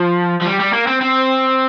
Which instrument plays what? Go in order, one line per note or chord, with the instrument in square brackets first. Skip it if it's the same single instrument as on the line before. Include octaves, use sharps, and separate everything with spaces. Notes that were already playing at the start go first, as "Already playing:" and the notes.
Already playing: [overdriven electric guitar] F3
F3
G3
G3
A#3
C4
C4